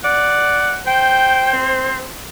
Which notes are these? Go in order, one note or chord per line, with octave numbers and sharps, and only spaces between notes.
D5 F#5
C5 G5
C4